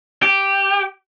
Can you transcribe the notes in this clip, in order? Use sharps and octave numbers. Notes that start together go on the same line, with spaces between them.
G4